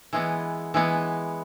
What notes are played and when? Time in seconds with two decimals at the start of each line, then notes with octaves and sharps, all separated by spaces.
0.13 E3 G#3 B3
0.74 E3 G#3 B3